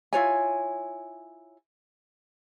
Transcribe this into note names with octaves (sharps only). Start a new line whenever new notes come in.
E4 F4 C#5 G#5